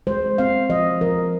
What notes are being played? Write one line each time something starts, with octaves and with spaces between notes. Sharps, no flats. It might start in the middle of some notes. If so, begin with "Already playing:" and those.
G#3 C5
C4 F5
F3 D#5
F3 A#4